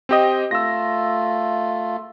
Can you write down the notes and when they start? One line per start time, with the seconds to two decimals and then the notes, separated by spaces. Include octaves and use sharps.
0.09 C4 G4 D#5
0.51 A3 F4 E6 A#6